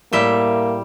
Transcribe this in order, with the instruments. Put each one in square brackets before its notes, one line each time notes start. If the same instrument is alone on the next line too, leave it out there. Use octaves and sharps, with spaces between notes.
[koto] A2 G3 E5 [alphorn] A#3